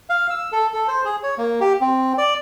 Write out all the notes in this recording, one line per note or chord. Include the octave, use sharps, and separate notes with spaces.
F5
E6
A4
A4
C5
G#4
C#5
A#3
G4
C4
D5